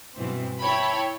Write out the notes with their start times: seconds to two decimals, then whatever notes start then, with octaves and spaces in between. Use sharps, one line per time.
0.15 G2 B2 E3 C4
0.60 E4 C#5 G5 A5 B5